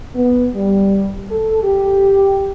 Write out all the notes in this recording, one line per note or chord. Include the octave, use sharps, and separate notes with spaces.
B3
G3
A4
G4